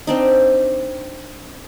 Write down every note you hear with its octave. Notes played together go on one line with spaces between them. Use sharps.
C4 D4 D#4